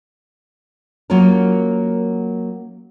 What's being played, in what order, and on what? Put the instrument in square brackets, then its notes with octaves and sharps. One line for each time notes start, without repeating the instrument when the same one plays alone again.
[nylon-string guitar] F#3 A#3 C#4 F4 A#4